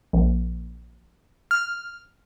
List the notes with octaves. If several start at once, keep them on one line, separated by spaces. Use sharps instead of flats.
A#1
F6